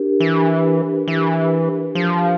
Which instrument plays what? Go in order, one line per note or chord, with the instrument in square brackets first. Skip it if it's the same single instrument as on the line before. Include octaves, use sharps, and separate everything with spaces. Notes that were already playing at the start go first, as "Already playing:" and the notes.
Already playing: [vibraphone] D4 G4 A#4
[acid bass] E3
E3
F3